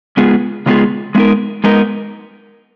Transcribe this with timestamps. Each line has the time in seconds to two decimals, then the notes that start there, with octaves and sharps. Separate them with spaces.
0.17 C#3 G#3 B3 F4 G#4
0.66 C#3 G#3 B3 F4 G#4
1.15 G#3 B3 D#4 A#4
1.64 G#3 B3 D#4 A#4